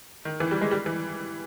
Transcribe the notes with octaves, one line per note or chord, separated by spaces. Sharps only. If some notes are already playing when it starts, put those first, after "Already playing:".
D#3
E3
G3
G#3
G3
E3